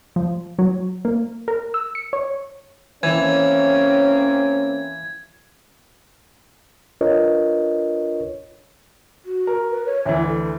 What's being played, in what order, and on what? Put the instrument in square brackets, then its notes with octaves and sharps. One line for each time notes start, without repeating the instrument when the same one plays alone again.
[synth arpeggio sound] F3
F#3
A#3
A#4
E6
C#7
C#5
[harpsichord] E3 [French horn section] A#3 C4 C#4 [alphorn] C#5 [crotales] G#6
[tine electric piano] D4 F4 A#4 B4 C#5 D#5
[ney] F#4
[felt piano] A#4
[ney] B4
C#5
[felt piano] D2 E3 [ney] E5
[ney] A4